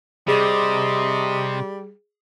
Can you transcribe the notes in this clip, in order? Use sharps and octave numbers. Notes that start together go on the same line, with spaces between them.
C3 G3 G#4 D#5